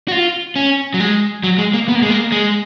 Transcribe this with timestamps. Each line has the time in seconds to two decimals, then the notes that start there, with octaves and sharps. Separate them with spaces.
0.08 F#4
0.12 F4
0.56 C#4
0.94 F#3
1.00 G#3
1.43 F#3
1.58 G#3
1.74 A#3
1.88 B3
1.95 A#3
2.02 G#3
2.10 A#3
2.32 G#3